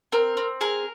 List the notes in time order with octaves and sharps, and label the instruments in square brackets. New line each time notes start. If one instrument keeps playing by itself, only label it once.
[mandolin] C4 A#4
C4
G#4 A#4